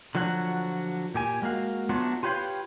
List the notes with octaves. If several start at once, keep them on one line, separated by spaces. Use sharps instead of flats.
D3 F3 F#3 F#4 F#5
A#2 G4 G#5
G#3 A#3 F#4 F5
F#3 A3 B3 D4 F4
F4 G4 B4 C#5 F5 G5